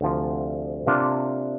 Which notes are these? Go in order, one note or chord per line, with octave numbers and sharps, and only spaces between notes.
D2 C3 F3
C3 A#3 D4 F4